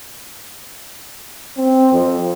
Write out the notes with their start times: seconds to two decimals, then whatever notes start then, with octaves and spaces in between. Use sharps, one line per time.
1.58 C4
1.93 F2